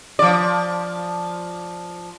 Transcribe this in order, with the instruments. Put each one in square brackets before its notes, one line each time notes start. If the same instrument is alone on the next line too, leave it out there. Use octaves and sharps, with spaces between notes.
[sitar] F3 D5